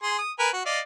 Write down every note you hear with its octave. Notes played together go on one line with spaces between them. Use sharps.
G#4 C6
D#6
A#4 B4 G#5
F#4
D5 D#5 F5